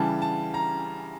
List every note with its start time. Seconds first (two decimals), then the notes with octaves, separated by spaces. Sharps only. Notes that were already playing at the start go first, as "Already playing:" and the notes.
Already playing: C#3 E3 G3 A5
0.22 A5
0.54 A#5